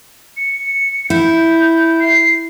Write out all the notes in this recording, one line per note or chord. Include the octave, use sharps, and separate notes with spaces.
C#7
E4 G6
C7